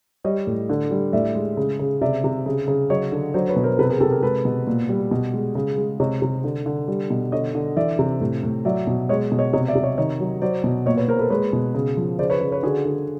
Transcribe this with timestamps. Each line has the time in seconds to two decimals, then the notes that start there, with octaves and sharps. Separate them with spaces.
0.24 G3 C#5 D#5
0.47 A2
0.69 D3
0.91 G3
1.13 A2 D5 E5
1.35 G#3
1.57 C#3
1.79 C#3
2.01 C3 D5 E5
2.24 C3
2.46 C#3
2.68 C#3
2.90 F#3 C#5 D#5
3.12 D3
3.34 F#3 C5 D5
3.49 B4 C#5
3.56 B2
3.64 A#4 C5
3.79 C3 A4 B4
3.90 G#4 A#4
4.00 C3 G4 A4
4.12 G#4 A#4
4.22 G#3 A4 B4
4.45 B2
4.67 A#2
4.89 G3
5.11 B2
5.34 G#3
5.55 C#3
5.78 G#3
6.00 C3 C#5 D#5
6.22 C3
6.44 D3
6.66 D3
6.88 G3
7.10 B2
7.32 D3 C#5 D#5
7.55 D3
7.77 E3 D5 E5
7.99 C3
8.21 A2
8.43 A2
8.65 F#3 D5 E5
8.87 B2
9.09 G#3 C#5 D#5
9.32 B2
9.39 C#5 D#5
9.53 C3 C#5 D#5
9.68 D5 E5
9.75 C3
9.83 C#5 D#5
9.98 D#3 C#5 D#5
10.20 F#3
10.42 F#3 C5 D5
10.64 B2
10.86 A#2 C#5 D#5
10.97 B4 C#5
11.08 A#2 A#4 C5
11.19 A4 B4
11.30 G#3 B4 C#5
11.53 B2
11.75 C#3
11.97 F3
12.19 C#3 C5 D5
12.30 B4 C#5
12.41 C#3
12.52 B4 C#5
12.63 D3 F#4 G#4
12.85 D3